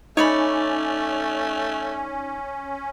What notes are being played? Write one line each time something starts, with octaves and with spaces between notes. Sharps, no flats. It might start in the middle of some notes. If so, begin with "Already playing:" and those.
A3 C#4 D#4 C#5 D5 B5